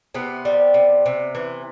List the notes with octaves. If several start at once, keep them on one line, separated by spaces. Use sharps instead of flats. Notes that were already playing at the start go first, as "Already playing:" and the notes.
C3 B3
G3
C3
C3
E3